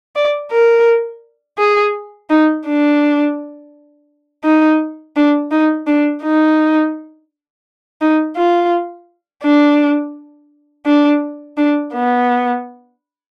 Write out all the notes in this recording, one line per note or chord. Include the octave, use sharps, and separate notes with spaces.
D5
A#4
G#4
D#4
D4
D#4
D4
D#4
D4
D#4
D#4
F4
D4
D4
D4
B3